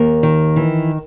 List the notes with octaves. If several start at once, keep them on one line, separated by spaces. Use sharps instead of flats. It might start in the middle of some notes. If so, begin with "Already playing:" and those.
Already playing: D#2 A#4
D#3
E3